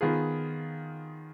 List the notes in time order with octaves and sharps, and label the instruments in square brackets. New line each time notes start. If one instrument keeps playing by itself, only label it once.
[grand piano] D#3 B3 F4 G#4